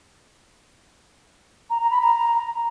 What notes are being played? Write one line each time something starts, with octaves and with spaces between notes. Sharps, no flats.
A#5
A#5
B5
A#5